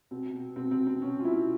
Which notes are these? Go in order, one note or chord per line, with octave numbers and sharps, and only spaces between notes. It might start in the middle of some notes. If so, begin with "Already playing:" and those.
B2 C4
B2
B2 C4
C4
B2
C4
B2 C#4
F4
B2 E4